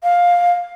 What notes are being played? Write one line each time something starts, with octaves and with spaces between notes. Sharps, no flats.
F5